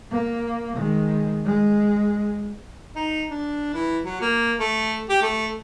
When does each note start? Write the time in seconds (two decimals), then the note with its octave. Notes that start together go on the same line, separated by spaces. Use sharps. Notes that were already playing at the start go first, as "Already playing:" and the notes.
0.11 A#3
0.76 D#3 G#3
1.46 G#3
2.96 D#4
3.30 D4
3.73 E3
4.05 F#3
4.21 A#3
4.60 A3
5.09 G4
5.22 A3